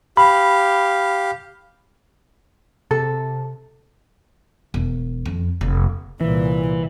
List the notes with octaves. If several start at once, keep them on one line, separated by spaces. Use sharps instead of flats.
G4 F5 B5
C3 A4
E1
F2
F1
C2 A#2 E3